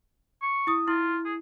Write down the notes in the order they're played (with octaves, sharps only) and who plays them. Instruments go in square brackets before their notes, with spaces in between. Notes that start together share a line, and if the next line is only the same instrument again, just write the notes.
[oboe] C#6
[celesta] E4 D#6
[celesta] E4 [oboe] F4
[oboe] G#4